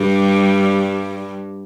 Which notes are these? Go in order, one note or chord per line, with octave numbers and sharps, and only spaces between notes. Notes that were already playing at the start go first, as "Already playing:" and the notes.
Already playing: G2 G3